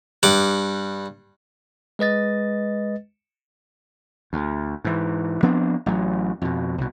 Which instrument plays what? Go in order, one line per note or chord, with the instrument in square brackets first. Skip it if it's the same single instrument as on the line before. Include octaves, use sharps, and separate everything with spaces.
[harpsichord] G2 F#5 D6
[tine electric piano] G#3 B4 D#5 A6
[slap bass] D2
G#2 E3
F3 B3 C4 D4
A1 F#3
F2 B2
C2 B2